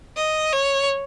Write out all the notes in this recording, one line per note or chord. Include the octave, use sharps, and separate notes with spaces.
D#5
C#5